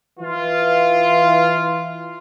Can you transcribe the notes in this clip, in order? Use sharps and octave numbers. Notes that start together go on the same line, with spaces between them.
E3 F4